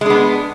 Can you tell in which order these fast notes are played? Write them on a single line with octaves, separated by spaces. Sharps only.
G#3 D4 B3